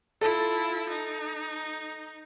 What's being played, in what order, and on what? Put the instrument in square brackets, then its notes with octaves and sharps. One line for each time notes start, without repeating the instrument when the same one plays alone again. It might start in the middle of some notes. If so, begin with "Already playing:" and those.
[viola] E4 F4 [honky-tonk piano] A4
[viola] D#4